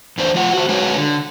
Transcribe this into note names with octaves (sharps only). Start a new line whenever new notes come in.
E2 D4 C5
F3 F4 F#5
F#4 C5
G#3 F#4 B4 C#5
D3